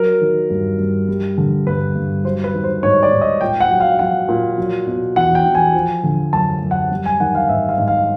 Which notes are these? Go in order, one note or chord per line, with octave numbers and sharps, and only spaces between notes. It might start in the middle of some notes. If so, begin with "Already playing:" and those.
Already playing: F#3 A#4
D#3
G2
G2
G3
D3
G2 B4
G2
F#3 C5
B4
D#3
C5
G#2 C#5
D5
G#2
D#5
A#2 G5
F#5
F#3
F5
F#3 F#5
A#2
F#3
B2
E2 F#5
G5
E2
G#5
F3
D3
F#2 A5
F#2
F#5
G3
G#5
D#3 F#5
F5
G#2 E5
F5
G#2
F5